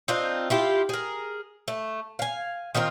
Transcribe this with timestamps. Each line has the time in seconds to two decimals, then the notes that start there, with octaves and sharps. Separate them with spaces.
0.08 C4 D4 D#4 F4
0.50 E4 F4 G4
0.89 G#4 A#4
1.68 A3
2.19 F5 G#5
2.75 D#3 C4 F4 A#4